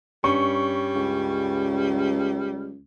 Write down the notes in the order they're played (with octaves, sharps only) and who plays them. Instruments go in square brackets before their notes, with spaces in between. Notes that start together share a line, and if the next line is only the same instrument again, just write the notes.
[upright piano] G2 C#4 [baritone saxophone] G3 [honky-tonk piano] C#6
[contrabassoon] C#2